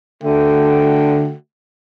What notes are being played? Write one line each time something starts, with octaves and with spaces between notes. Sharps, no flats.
D3 A3 F#4 G5